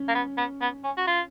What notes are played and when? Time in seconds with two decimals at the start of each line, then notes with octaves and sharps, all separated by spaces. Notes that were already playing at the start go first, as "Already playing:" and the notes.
Already playing: C#4
0.08 A#3
0.15 B3
0.37 B3
0.61 B3
0.84 C#4
0.97 F#4
1.07 F4